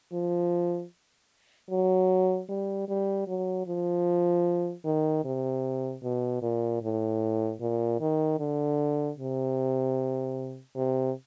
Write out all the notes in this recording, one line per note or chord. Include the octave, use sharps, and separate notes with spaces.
F3
F#3
G3
G3
F#3
F3
D#3
C3
B2
A#2
A2
A#2
D#3
D3
C3
C3